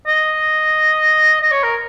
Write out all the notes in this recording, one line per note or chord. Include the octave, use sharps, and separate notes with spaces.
D#5
D#5
C#5
A#4